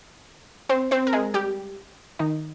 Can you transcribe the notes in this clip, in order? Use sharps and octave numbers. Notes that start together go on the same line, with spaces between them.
C4 C5
C4 C5
A#4
G#3 G#4
G3 G4
D#3 D#4